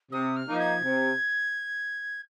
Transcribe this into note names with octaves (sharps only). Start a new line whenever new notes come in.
C3 D#6
F6
F3 A#3 D#4
G#6
C3